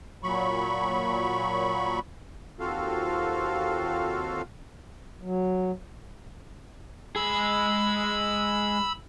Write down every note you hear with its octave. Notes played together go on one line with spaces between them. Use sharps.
A#2 F#3 B5 C#6
D#2 C4 F4 F#4 A4 F5
F#3
G#3 G#4 B5 E6